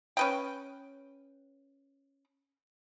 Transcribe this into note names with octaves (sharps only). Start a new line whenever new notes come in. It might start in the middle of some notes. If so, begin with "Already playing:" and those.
C#4 B4 G5